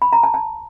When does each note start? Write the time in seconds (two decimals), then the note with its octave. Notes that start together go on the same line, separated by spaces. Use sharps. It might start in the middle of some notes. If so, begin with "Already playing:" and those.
0.02 B5
0.13 A#5
0.23 A5
0.34 A5